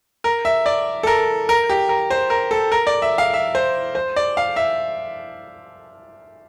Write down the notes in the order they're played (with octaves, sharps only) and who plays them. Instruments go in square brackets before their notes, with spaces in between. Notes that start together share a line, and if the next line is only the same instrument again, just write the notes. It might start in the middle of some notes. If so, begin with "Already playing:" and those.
[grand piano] A#4
E5
D5
A4
A#4
A#4
G4
A#4
C5
A#4
A4
A#4
D5
E5
F5
E5
C5
C5
D5
F5
E5